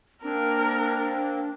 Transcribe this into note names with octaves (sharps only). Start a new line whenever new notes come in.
A#3 C4 D4 A#4